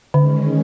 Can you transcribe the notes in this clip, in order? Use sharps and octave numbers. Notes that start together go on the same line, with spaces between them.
D3 D#3 G#3 C#4